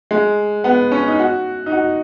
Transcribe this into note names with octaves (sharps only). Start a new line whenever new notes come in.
G#3
B3
C#4
D#4
F#4
D#4
F#4